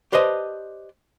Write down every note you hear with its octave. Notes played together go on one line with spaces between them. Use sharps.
G4 B4 C5 D5 D#5 A5